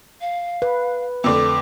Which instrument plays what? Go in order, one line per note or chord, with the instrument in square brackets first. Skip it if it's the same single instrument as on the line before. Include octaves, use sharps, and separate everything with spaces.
[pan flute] F5
[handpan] B4
[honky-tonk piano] F2 D3 A3 [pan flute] D6